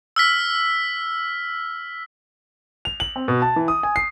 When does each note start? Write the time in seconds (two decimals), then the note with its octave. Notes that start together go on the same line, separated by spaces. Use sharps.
0.16 E6 F6 B6
2.85 F7
3.00 F#7
3.16 C4
3.28 B2
3.42 A5
3.56 E3
3.68 D#6
3.83 G#5
3.96 C7